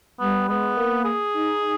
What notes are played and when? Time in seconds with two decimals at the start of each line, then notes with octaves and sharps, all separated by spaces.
0.20 G3 B3
0.49 G#3 B3
0.77 A#3
1.05 G#4
1.34 D#4